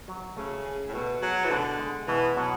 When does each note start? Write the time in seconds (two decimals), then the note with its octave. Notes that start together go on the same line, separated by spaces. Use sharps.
0.08 F#3
0.37 C#3 A3
0.66 G#4
0.88 A2
0.94 B2 A3
1.22 F#3 G#4
1.44 E3
1.50 B2 D3
1.79 G#3
2.08 B2 E3
2.37 B2 F#3